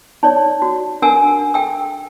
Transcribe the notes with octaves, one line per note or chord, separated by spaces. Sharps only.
D#4 C#5 D5
F#4
D4 A#4 F#5 G#5 E6
A4 G5 E6